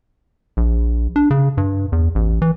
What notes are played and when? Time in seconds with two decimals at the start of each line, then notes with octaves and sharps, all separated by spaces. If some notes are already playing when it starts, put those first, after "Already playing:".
0.57 A#1
1.16 D4
1.31 C#3
1.57 G2
1.92 E2
2.15 A1
2.42 E3